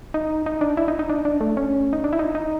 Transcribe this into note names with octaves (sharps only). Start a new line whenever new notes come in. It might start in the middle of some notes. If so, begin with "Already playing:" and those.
D#4
D#4
D4
E4
D#4
D#4
D4
D4
A3
C#4
D#4
D4
E4
D#4
D#4